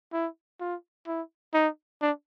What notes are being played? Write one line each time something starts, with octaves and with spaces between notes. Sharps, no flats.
E4
F4
E4
D#4
D4